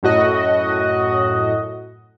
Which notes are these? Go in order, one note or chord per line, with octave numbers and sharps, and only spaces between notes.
F#2 A2 F#4 D#5